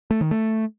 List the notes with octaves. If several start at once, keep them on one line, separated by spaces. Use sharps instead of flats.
A3
D#3
A3